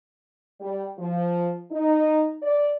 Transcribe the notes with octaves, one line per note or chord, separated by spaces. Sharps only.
G3
F3
D#4
D5